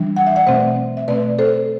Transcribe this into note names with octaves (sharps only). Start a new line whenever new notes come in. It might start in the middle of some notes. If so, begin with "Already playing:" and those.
Already playing: E3 G3 D4
F#5
E5
D5 F#5
B2 A3 C4 C5 E5
E5
B2 A3 C4 B4 D5
A4 C5